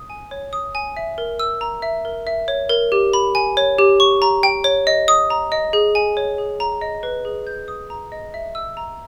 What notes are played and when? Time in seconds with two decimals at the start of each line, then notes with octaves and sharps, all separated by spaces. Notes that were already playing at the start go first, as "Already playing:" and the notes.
Already playing: D#6
0.10 G#5
0.31 C#5
0.53 D#6
0.75 G#5
0.97 E5
1.18 A#4
1.39 E6
1.61 A#5
1.82 E5
2.05 A#4
2.27 E5
2.48 C#5
2.70 A#4
2.92 G4
3.13 B5
3.35 G#5
3.57 C#5
3.79 G4
4.00 C#6
4.22 A#5
4.43 G5
4.64 C#5
4.87 D#5
5.08 D#6
5.30 A#5
5.52 D#5
5.73 G#4
5.95 G#5
6.17 C#5
6.38 G#4
6.60 A#5
6.81 D#5
7.03 B4
7.25 G#4
7.47 G6
7.68 D#6
7.90 A#5
8.12 D#5
8.34 E5
8.55 E6
8.77 A#5